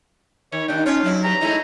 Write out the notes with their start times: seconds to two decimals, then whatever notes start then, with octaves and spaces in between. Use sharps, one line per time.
0.52 D#3 C#5
0.68 D#2 D4 G5
0.86 C#4 F4 C#5
1.04 G2 F#3 E4
1.24 G4 B4 A#5
1.41 G#3 A3 D#4 E4